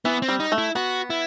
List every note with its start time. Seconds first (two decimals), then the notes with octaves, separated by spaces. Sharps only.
0.05 E3 B3
0.22 C4
0.28 G3
0.40 D#4
0.52 A3
0.58 E4
0.75 B3 F#4
1.10 E4